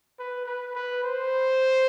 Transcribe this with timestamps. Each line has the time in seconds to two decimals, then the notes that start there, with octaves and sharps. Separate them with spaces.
0.19 B4
0.46 B4
0.75 B4
1.04 C5